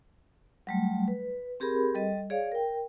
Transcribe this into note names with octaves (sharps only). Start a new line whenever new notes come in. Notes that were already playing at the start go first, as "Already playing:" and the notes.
F#3 G3 A3
B4
C4 G4 G#4 A#4 B5
G3 A4 D#5
G#4 C#5 D5 F5
A#4 G5